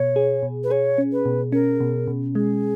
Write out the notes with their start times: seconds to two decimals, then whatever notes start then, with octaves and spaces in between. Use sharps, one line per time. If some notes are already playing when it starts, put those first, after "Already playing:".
Already playing: B2 C#5
0.16 G#4
0.43 B2
0.63 B4
0.70 G#4 C#5
0.98 C#4
1.12 B4
1.25 B2
1.52 C#4 A#4
1.80 B2
2.07 B2
2.35 G#3 G#4